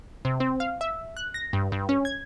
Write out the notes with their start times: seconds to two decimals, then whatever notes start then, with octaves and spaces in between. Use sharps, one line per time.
0.25 C3
0.40 C4
0.60 F5
0.81 E5
1.17 F#6
1.34 A#6
1.53 G2
1.72 G2
1.89 C#4
2.05 G#6